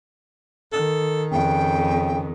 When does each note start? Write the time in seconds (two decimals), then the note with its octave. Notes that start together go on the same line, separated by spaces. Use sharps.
0.72 D#3 A4
1.32 F2 C#3 G5